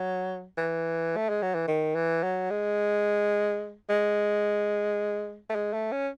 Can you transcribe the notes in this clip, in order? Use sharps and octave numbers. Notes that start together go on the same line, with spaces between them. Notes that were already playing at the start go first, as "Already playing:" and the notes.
Already playing: F#3
E3
A3
G#3
F#3
E3
D#3
E3
F#3
G#3
G#3
A3
G#3
A3
C#4